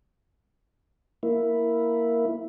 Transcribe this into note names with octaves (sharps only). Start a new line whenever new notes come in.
A#3 E4